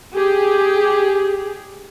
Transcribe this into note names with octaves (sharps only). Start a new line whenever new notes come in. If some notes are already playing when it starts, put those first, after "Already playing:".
G4 G#4